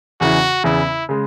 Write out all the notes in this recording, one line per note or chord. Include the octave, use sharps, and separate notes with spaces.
E2 C#3 E3 F#4
E2 C#3 E3 E4
C#3 G#3